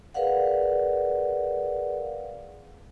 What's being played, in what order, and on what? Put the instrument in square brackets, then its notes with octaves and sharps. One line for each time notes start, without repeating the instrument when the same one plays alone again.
[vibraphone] G#4 A#4 B4 D5 F5 F#5